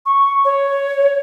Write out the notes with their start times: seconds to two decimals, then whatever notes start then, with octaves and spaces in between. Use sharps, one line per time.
0.06 C#6
0.45 C#5